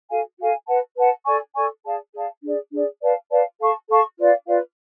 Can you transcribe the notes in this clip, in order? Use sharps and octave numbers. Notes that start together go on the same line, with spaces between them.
F#4 A4 F5 G#5
F#4 A4 F5 G#5
B4 F#5 A5
B4 F#5 A5
A4 D5 G#5 C#6
A4 D5 G#5 C#6
G#4 D5 F5 A5
G#4 D5 F5 A5
D4 G#4 D5
D4 G#4 D5
B4 D5 F5 A5
B4 D5 F5 A5
A4 F5 A5 C#6
A4 F5 A5 C#6
F4 B4 D5 F5
F4 B4 D5 F5